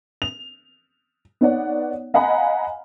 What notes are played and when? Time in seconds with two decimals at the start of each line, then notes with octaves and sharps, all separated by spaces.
0.22 F7
1.41 B3 D#4 C#5 D5 F#5
2.14 D#5 F5 F#5 G#5 A#5 B5